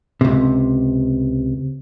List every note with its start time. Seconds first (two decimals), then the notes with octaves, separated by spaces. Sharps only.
0.21 C#2 C3